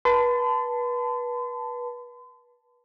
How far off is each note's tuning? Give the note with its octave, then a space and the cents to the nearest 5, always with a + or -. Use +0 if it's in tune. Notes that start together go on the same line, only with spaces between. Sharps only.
B4 -25 A5 +5 C6 -45